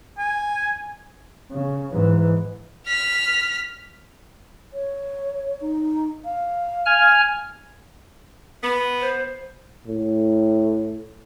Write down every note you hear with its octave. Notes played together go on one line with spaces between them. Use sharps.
G#5
C#3
G#2 E3
F6 B6
C#5
D#4
F5
G#5 F6
B3
C5
A2